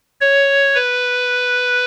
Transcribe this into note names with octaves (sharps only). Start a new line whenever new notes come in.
C#5
B4